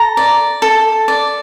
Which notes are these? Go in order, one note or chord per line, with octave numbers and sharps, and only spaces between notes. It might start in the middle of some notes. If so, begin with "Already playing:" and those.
Already playing: A4 A#5
D5
A4
D5